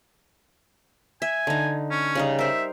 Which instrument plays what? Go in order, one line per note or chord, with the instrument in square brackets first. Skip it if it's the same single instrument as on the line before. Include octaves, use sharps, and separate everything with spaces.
[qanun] E5 [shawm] G#5
[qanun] D3 D#4
[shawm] C#4
[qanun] C#3 G3 D#4
[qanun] A#4 C5 [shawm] E5